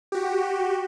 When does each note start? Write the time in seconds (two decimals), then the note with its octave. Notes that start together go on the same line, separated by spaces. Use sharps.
0.12 F#4 G4